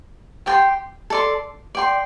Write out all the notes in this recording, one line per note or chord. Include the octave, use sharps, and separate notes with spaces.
G4 D5 G5 C6
A4 D5 C6
D5 G5 C6